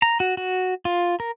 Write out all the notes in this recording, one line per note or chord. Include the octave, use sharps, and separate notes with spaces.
A#5
F#4
F#4
F4
A#4